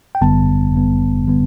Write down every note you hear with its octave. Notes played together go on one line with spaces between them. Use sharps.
G5
G1 F#2 D3 G3 B3 A5
G1 F#2 D3 G3 B3
D3 G3 B3